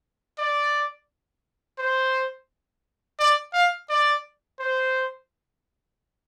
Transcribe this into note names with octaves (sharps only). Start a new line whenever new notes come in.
D5
C5
D5
F5
D5
C5